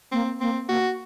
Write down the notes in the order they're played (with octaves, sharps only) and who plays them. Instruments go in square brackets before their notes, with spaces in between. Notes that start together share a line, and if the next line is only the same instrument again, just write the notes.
[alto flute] A#3 [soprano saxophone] C4
[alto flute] A#3 [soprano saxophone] C4
[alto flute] A#3 [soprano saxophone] F#4